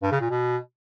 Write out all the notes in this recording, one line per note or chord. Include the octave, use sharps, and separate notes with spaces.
G2
C#3
A#2
B2